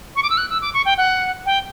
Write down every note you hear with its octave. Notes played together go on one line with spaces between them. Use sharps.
C#6
D6
E6
F#6
E6
D6
C#6
G5
F#5
G5